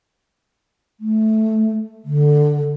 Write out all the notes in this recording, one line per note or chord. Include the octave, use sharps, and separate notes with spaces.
A3
D3